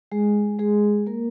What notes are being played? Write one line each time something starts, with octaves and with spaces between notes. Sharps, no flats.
G#3 G#4
G#3 G#4
A#3 A#4